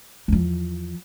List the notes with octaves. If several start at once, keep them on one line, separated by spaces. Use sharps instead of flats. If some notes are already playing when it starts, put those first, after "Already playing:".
E2 F3